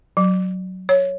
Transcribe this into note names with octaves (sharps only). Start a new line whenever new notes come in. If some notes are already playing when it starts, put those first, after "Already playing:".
F#3
C#5